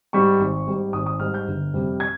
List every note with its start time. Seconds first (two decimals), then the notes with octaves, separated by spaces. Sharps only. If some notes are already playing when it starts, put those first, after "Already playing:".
0.13 G#2 G3 C#6
0.39 G#1
0.67 G#2 G3
0.93 G#1 D#6
1.06 D#6
1.20 G#2 G3 F6
1.34 G6
1.48 G1
1.74 F2 C3 G3
2.00 G#6